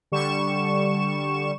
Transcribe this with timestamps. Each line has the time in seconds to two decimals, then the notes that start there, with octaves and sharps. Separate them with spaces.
0.12 D3 G3 C#6 E7